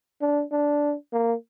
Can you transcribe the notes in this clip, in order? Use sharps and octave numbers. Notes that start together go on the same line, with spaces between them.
D4
D4
A#3